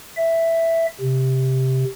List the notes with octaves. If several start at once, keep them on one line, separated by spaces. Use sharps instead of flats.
E5
C3